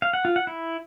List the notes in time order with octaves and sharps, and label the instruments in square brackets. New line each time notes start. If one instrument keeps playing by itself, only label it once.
[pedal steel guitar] F5
F#5
F4
F#5
E4